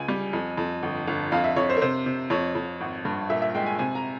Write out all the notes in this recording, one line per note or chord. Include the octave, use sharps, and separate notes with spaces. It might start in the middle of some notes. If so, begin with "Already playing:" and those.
Already playing: C#2 G#5
G3
F2
F2
G1
G1
F2 F5
E5
F2 C#5
C5
A#4
C3 C5
C3
F2 C#5
F2
G#1
G2
A#2 E5
E5
G#3 G5
G#5
C3 G#5
A#5